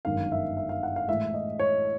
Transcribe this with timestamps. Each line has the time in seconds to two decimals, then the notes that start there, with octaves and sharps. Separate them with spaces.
0.05 G1 F#2 D#3 G#3 F5
0.32 E5
0.57 E5
0.69 F5
0.83 F#5
0.96 F5
1.08 A2 E3 G#3 E5
1.34 D#5
1.59 C#5